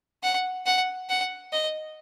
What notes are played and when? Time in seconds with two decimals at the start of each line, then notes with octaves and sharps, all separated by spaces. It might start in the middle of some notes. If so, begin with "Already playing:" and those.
0.23 F#5
0.66 F#5
1.09 F#5
1.53 D#5